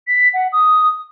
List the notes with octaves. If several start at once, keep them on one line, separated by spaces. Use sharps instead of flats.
B6
F#5
D#6